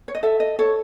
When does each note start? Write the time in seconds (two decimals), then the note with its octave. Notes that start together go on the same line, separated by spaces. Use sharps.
0.08 C#5
0.15 D#5
0.23 A4 E5
0.40 D#5
0.59 A4 C#5